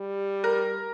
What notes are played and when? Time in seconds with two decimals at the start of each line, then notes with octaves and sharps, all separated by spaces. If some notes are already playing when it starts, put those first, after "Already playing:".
Already playing: G3
0.44 A#4